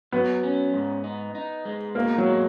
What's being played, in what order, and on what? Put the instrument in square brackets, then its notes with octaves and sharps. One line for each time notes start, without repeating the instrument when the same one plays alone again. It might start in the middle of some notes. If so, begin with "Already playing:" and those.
[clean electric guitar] F#3 [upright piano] B3
[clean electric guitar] C#4
G#2
D#4
D#4
G#3
[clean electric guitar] B2 [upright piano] A#3
[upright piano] F#3
[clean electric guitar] G#3